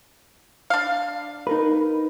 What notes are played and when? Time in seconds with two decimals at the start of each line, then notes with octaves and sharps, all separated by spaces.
0.70 D4 F5
1.47 D#4 A#4 B4